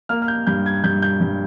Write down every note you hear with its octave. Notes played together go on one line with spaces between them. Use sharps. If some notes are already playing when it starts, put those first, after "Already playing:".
A#3 F6
F6
G6
G2 G6
G#6
G2 G6
G6
G2